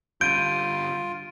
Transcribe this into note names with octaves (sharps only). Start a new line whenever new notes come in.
D3 G3 F4 G6 D7 D#7